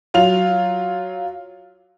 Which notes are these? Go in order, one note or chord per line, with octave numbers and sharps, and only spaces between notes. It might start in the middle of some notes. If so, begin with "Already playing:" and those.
F#3 F4 F7